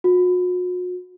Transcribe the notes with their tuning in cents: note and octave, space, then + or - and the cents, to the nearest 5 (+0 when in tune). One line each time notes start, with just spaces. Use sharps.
F#4 -40